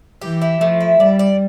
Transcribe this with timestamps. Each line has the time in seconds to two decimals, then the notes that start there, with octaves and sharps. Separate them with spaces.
0.22 E3 G4
0.42 E4
0.61 F3 A3
0.81 E4
1.00 G3 D5
1.19 D5